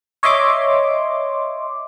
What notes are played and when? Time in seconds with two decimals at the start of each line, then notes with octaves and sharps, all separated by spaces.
0.23 C#5 D#5 E5 C6 D6